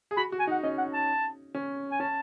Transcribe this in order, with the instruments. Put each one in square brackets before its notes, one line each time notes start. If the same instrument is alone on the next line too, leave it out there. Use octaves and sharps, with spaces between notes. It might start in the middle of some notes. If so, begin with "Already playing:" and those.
[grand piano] G#4
[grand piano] F#4 [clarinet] B5
[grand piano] F#4
[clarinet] G#5
[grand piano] D#4
[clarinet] F#5
[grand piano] C#4 [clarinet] D#5
[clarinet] F#5
A5
[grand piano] C#4
[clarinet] G#5
[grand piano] C#4 [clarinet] A5